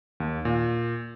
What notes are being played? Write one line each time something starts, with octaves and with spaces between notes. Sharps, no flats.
D#2
A#2